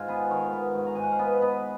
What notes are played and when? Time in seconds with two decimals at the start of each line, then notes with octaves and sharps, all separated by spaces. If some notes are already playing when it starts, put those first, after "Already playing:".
Already playing: G#2 F4
0.08 B3 G#4 B4
0.31 D#3 A#4 C#5
0.53 B3
0.75 G#2
0.86 A#5
0.95 G#2 G#5
1.03 F#5
1.12 F5
1.19 B3 B4 D#5
1.41 B3 B4 D#5